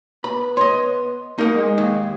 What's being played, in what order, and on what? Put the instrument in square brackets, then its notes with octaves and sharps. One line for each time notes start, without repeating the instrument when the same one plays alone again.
[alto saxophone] B3 [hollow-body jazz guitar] B5
[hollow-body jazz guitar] C#5 D#5 [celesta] C6
[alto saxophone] A#3 [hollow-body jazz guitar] D#4 A#4 F#5
[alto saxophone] G#3
[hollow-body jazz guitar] D#2